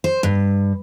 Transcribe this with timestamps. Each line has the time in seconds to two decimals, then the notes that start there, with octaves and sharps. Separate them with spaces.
0.04 C5
0.23 G2